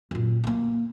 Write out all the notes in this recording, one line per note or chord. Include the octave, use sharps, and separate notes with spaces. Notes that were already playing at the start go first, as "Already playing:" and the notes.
F#2 A#2
A3 A#3